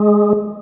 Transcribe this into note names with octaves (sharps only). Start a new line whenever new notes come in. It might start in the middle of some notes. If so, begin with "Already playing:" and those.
Already playing: G#3